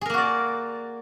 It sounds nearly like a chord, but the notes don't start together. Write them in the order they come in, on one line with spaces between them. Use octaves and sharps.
G#4 A#4 A#3 F#4 D5